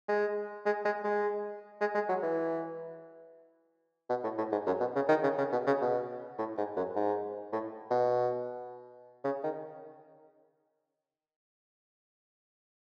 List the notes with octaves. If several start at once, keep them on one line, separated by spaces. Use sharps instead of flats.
G#3
G#3
G#3
G#3
G#3
G#3
F#3
E3
B2
A2
A2
G#2
F#2
B2
C#3
D#3
C#3
C#3
B2
C#3
B2
A2
G#2
F#2
G#2
A2
B2
C#3
D#3